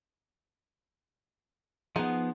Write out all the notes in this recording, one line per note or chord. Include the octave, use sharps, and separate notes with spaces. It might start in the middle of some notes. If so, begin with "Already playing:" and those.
F3 B3 D#4 G#4 F#5